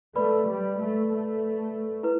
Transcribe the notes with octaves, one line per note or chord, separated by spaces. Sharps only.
A3 B4 D5 B5
G3
A3
A3
E4 B4